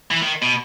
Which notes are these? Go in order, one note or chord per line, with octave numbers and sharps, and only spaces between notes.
E3
D#3
B2